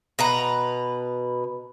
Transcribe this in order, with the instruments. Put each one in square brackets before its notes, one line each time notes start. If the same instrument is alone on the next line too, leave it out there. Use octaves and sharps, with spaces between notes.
[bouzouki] B2 B4 A#5